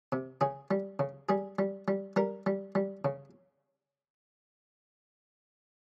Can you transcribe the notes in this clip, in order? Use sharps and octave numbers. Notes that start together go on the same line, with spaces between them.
C3
C#3 G#4
G3
C#3
G3 G#4
G3
G3
G3 A#4
G3
G3
C#3